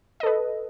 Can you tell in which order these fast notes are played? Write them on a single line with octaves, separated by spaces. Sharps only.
D#5 A4 B4